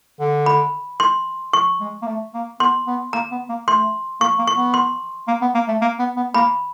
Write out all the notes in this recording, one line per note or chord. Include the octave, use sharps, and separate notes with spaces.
D3
B5
C6
C#6
G#3
A#3
A3
A#3
B3 C6
B3
A#3 A#5
B3
A#3
A3 C6
A#3 C#6
A#3
C#6
B3
C6
A#3
B3
A#3
A3
A#3
B3
B3
A#3 B5